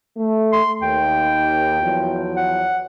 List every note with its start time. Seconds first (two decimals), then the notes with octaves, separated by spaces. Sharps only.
0.17 A3
0.53 C6
0.82 D#2 G5
1.82 E2 F3 F#3
2.37 F#5